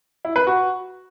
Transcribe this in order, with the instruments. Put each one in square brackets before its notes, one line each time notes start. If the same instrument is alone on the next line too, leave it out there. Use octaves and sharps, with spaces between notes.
[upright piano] E4
B4
F#4